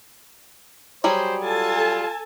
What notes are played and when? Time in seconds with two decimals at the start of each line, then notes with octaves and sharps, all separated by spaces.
1.04 F#3 G3 G#4 C5
1.43 F4 A4 G#5 A5